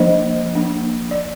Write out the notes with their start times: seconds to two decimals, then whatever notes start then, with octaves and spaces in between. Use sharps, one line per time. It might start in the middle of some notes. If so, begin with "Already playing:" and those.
Already playing: F3 A#3 D4 C5 D#5
0.55 F3 A#3 D4
1.11 D5